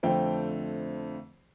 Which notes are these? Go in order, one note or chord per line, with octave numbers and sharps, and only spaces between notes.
F2 D3 A3 C4 G5